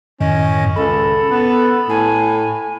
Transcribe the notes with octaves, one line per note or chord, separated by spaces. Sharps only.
F#2 A2 D#3 C#4 D#5
C#2 A4 B5
B3
A2 G#5